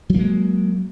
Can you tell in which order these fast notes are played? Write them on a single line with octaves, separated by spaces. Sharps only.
F#3 A#3 G#3